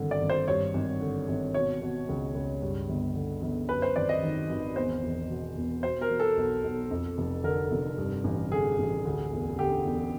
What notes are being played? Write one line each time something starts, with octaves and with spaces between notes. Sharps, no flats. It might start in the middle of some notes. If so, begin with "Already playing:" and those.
Already playing: G#1 G2 D3
D5
G#1
C5
G2 C#5
G#1
D3
G#1
B2 C#5
B2
C#2
C#2
G2
G1
D3
G1
F#2 B4
C5
G#1 D5
D#5
D#3
G#1
E2 C5
E1
B2
E1
B2 C5
A#4
B2
A4
B1
B1
F2
F1
D3 A#4
F1
G2
A1
D3 G#4
A1
D2
E1
D3 G4
E1